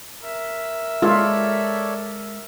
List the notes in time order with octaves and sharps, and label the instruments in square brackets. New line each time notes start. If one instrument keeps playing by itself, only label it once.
[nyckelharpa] A#4 E5
[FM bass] G#3 [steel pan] F4 [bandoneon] A4 C#5 D5